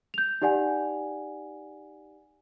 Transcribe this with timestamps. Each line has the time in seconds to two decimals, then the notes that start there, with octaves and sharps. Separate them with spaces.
0.14 G6 F7
0.42 D#4 G4 D5 F#5 G#5